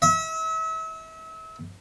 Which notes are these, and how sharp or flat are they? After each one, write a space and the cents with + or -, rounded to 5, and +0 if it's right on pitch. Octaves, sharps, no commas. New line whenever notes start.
E5 -35